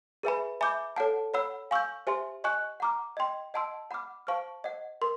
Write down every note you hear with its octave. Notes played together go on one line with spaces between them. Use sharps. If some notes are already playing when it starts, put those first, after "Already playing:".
G#4 B4 E5 G#5 B5
E5 G#5 B5 D6 G6
A4 C#5 F#5 A5
C#5 F#5 B5 E6
F5 G#5 C#6 E6 G6
G4 C5 E5 G#5 C6
D#5 G#5 C#6 F#6
F#5 A#5 D6 F6
D#5 G5 C6
D#5 F#5 A5 C6 E6
F#5 B5 D6 F6
C5 F5 A5 C#6 F6
C5 D#5 F#5
A#4 C6